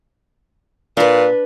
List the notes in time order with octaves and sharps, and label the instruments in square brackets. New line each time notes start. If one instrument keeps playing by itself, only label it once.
[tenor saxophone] A#2 [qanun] D4 B4